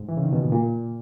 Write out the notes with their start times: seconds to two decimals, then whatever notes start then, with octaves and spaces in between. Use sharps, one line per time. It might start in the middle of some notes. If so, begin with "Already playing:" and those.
Already playing: G#2
0.09 E3
0.17 C#3
0.23 D#3
0.33 B2
0.42 A#2
0.53 A#2